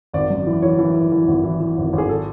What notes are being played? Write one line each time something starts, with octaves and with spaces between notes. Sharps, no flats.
G#1 D5
F#2
E3
E3 C#5
E3
E3
E3
G#1
E3
E3
G#1
G#1
G#4
A4